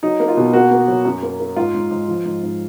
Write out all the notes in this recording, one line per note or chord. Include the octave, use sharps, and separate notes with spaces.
F#3 D#4
A#3
F4
B2
A#3 F#4
A#3
F#3
F#2
A#3
A#3
G#2 F4
G#2
G#2
F3
G#2
G#2